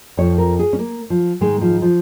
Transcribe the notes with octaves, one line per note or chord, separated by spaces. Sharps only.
F2 F3 C#5
A#4
G#4
C#4
A#3
F3
G#2 D#3 G#3
F3
F3